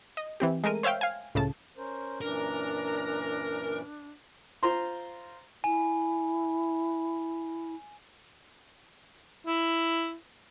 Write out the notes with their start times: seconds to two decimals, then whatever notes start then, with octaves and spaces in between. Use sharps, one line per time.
0.17 D#5
0.40 E3 C4 G4
0.64 G#3 A3 A#4 D#7
0.83 C5 C#5 E5 F5 G5
1.01 F5 G#5
1.35 C#2 A2 C#3 A5
1.77 C#4 A#4 C5
2.21 F#2 A#2 E3 D4 A#4
4.63 F4 C5 A#5 C6
5.64 E4 G#5
9.47 E4